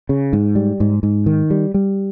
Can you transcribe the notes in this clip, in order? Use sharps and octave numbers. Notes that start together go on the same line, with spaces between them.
C#3
G#2
G3
G#2
G#2
D#3
G3
G3